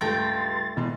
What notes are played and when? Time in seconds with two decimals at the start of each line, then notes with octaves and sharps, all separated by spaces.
0.01 C#2 G2 A3 G5 C6 A6 A#6
0.77 B2 E3 D#5 C6 A6